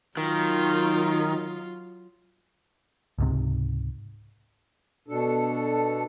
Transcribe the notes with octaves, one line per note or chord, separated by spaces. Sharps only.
D#3 F#3 F4
C#2 G#2 C3
B2 D4 A4